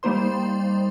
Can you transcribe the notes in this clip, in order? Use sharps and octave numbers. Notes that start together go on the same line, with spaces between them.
G3 A#3 D#4 C5 C6